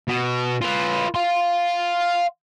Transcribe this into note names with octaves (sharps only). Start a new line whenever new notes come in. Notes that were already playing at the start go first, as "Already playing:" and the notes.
B2
F4 B4
F5 C6